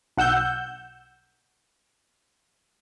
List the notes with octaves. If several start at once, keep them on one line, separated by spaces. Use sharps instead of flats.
B1 F#5 E6 G6